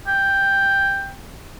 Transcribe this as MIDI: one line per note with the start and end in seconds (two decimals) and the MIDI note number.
0.07 1.12 79